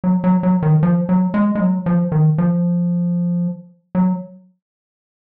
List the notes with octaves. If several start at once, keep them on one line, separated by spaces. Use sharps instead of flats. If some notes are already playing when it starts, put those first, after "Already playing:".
F#3
F#3
F#3
D#3
F3
F#3
G#3
G#3
F#3
F3
D#3
F3
F#3